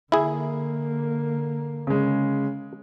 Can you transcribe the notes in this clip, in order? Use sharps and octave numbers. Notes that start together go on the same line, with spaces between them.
D3 A#3 E4 G#4
C#3 G#3